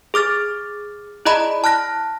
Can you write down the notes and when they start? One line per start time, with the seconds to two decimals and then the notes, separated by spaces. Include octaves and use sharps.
0.14 G#4 D6 F6 A6
1.25 E4 G#4 D5 D#5 A#5 B5
1.64 A5 F6 F#6 A#6